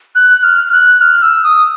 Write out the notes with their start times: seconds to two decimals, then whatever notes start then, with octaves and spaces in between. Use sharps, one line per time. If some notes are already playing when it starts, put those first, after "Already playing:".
0.15 F#6
0.43 F6
0.72 F#6
1.01 F6
1.22 E6
1.44 D#6